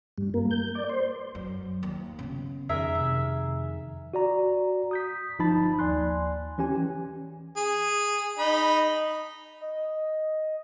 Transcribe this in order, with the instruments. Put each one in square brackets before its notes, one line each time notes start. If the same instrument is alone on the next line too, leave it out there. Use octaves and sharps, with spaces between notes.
[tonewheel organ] G2
A#3
G6
D5
C5
[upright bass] F#2
D#2
C#3 B3
[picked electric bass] F2 D#3 [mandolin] G#4 A#4 E5
[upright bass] C3
[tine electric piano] F#4 D5 A#5
D#6 G6 B6
G1 F3 D#4 A5 B5 A6
D#2 D5 G#5 C6 F#6
E3 C#4 G4 G#5
[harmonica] G#4
D#4 B5
[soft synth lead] D#5